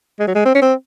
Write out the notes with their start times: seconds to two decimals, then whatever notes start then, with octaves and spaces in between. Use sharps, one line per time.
0.20 G#3
0.28 F#3
0.35 G#3
0.46 C4
0.55 C#4
0.62 C4